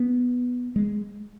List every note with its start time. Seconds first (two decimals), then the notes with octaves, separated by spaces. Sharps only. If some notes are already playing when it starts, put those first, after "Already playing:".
Already playing: B3
0.76 G#3